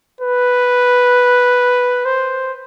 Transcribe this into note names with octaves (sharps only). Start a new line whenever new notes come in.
B4
C5